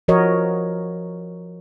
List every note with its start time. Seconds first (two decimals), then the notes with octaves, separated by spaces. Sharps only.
0.08 F3 F#4 A#4 C#5 D#5